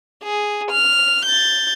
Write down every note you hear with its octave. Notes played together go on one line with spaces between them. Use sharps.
G#4
F6
G6 A6